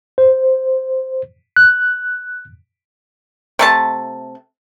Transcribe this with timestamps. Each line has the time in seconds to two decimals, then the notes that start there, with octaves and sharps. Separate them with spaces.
0.18 C5
1.56 F#6
3.59 C3 A3 A5